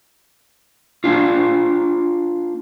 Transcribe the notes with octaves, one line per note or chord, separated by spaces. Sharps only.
A#3 C#4 D4 F4